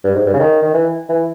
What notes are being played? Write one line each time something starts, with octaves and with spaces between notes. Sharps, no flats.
G2
G#2
G2
C#3
D#3
D#3
E3
E3